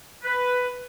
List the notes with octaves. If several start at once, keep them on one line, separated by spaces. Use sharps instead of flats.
B4